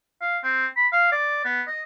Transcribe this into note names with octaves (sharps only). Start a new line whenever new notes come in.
F5
C4
B5
F5
D5
B3
D#5